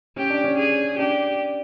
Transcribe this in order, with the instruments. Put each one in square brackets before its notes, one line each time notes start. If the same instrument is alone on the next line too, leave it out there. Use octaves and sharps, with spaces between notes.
[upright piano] C#4 [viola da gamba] G4
[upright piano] D4
C#4
[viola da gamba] G#4
[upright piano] D4 [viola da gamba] G4